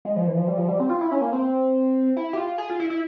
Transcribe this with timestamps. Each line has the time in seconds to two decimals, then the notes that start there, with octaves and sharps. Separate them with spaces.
0.05 G#3
0.16 F3
0.27 E3
0.37 F3
0.48 G3
0.58 F3
0.68 G3
0.80 C4
0.89 F4
1.01 E4
1.12 C#4
1.21 A#3
1.33 C4
2.17 E4
2.33 G4
2.37 F4
2.58 G#4
2.70 F4
2.80 E4
2.90 E4